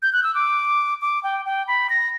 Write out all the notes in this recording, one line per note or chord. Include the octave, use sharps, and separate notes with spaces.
G6
F#6
E6
D6
D6
G5
G5
B5
A#6